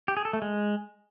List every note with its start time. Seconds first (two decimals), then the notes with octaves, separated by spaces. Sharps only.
0.08 G4
0.17 G#4
0.25 A4
0.33 A3
0.42 G#3